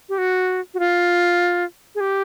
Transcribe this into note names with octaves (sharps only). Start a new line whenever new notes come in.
G4
F#4
F#4
F4
G#4
G4